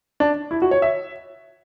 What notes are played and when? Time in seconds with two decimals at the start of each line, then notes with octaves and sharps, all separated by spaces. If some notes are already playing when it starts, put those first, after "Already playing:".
0.20 D4
0.51 E4
0.62 F#4
0.71 C#5
0.82 E5